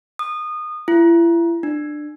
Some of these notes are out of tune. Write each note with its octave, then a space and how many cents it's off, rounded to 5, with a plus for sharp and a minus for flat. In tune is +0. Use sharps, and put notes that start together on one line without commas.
D#6 -25
E4 +35
D4 +20